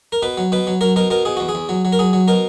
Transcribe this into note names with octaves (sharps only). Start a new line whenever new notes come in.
A#4
B2 B4
F#3
B2 B4
F#3
F#3 A#4
B2 A#4
B2 A#4
B2 G#4
E2 F#4
G#4
E2
F#3
F#3
A#4
F#3 G#4
F#3
B2 A#4